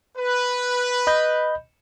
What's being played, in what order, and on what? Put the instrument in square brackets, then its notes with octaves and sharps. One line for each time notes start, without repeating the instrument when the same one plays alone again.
[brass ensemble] B4
[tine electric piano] D#5 B5 G6